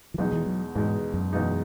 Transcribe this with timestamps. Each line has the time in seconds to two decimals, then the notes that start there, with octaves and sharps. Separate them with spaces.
0.14 E3
0.18 E2 B2 F#3 G#3 D#4
0.32 E3
0.46 F#3
0.75 E2 G#2 B2 G#3 D#4
1.14 F#2
1.33 E2 B2 G#3 D#4